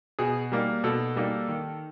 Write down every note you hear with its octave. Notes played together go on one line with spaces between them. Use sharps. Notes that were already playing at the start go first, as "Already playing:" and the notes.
B2 G#4
G3 A#3 D#4
B2 A4
G3 A#3 D#4
D#3